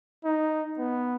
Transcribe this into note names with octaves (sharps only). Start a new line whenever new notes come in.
D#4
B3